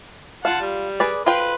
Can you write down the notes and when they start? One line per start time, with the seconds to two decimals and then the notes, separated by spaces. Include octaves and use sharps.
0.45 F4 F5 F#5 A5
0.61 G3
1.00 G#4 B4 D5
1.26 F4 B4 C5 G5 C6